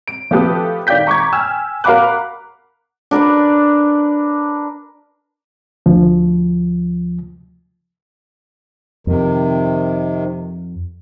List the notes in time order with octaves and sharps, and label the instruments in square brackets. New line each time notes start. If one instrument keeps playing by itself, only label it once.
[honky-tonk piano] D7
F3 A3 G4 A4 B4 D#6
D#3 D5 F5 G5 G6 B6
A#5 C#6 D6 G6 G#6
G5 G#5 E6 F6
A#4 F5 F#5 B5 D6 F#6
[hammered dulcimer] D4 A#4 B4 D5
[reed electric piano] D2 F3
[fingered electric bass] F2 [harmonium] C3 D#3